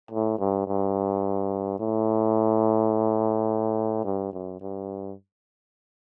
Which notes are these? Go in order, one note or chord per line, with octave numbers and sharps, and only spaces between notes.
A2
G2
G2
A2
G2
F#2
G2